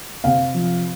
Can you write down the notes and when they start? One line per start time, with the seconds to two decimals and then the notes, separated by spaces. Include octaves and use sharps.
0.24 C3 F5
0.54 F3